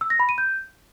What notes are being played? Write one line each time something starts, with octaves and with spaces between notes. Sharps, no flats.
E6
A#6
B5
D#7
G6